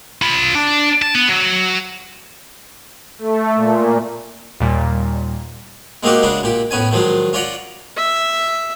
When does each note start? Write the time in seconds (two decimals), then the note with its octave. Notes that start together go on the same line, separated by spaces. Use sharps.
0.22 F4 B5
0.55 D4
1.02 A5
1.15 B3
1.29 F#3
3.18 A3
3.56 A#2
4.60 D#2 A#2 G3
6.03 G#3 A#3 C4 D#4 F#4 G4
6.23 C#3 G#3 D4 F#4
6.43 A#2 G4
6.71 A2 B3 C#4 G#5
6.91 D#3 F3 F#3 G#3
7.33 C#4 F4 D5 F#5 A#5
7.97 E5